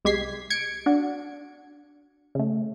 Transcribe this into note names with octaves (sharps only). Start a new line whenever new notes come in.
C2 G#3 G4 G#6 B6 C7
G#6 C#7 D7
D4 F#4
C#3 A3